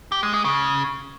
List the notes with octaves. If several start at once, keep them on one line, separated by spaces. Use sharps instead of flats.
G4
G#3
G#3
C#3